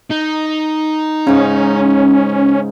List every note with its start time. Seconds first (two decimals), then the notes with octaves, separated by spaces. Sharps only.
0.10 D#4
1.27 G#2 C#3 C#4